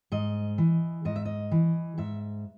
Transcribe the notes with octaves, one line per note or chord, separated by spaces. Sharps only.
G#2 D#5
E3
G#2 D#5
E5
D#5
E3
G#2 E5